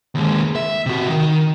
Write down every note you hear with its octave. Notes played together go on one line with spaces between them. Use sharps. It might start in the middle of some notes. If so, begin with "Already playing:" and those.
D#2 G#3
E5
C3 F#4
D#3